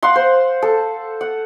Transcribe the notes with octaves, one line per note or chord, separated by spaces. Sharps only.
F5 F#5 C6
C5
A4
F#5